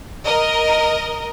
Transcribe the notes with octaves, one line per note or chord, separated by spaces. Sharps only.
A#4 D#5